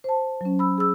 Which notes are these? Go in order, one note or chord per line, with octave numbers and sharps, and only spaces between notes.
C5 A5
F#3 C#4
B5 E6
G#4 E6